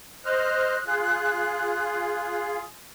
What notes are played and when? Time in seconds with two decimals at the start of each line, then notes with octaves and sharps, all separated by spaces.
0.25 C5 D#5 F6 F#6
0.86 F4 G#4